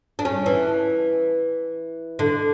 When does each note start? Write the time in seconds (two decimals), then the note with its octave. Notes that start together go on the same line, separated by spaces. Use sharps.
0.19 D4
0.25 C#4
0.46 E3
2.19 D3